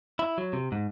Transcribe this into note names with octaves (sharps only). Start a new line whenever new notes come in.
E4
F#3
C3
G#2